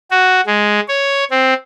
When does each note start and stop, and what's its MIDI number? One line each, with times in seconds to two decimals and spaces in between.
0.11 0.41 66
0.47 0.80 56
0.88 1.24 73
1.31 1.54 60